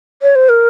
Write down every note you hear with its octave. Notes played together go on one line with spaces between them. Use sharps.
C#5
C5
A#4